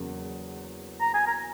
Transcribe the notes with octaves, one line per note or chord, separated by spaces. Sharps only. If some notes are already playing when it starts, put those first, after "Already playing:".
Already playing: E2 C#3 F#3 A#3
A#5
G#5
A#5